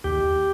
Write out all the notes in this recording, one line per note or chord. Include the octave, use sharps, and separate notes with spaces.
D#2 G4